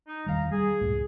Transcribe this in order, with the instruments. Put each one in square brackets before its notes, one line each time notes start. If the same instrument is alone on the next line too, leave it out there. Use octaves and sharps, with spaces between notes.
[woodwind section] D#4
[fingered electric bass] E2 D#3 G3 [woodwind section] F5 A#5
[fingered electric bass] G3 [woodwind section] G#4
[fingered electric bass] C#2 F#2 A2